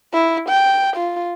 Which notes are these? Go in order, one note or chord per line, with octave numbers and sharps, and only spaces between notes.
E4
G5
F4